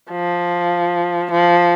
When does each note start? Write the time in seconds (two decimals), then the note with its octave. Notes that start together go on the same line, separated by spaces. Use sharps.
0.11 F3
1.31 F3